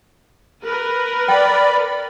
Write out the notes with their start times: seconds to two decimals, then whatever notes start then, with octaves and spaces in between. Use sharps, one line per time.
0.64 A#4 B4
1.28 D5 G5 B5